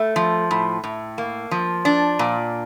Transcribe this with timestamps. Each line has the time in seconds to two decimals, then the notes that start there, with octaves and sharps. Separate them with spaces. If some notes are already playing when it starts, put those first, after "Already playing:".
Already playing: A3
0.16 F3
0.51 A2
0.84 A2
1.18 A#3
1.51 F3
1.85 D4
2.19 A#2